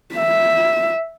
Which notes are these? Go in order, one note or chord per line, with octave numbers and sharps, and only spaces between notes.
E5